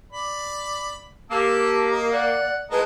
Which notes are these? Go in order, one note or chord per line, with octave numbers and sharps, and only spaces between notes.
D5 B5
A#3 G4 A5 E6
A#4 D#5
D5 F#5
A2 F3 G#3 A#4 B4 D#5 A5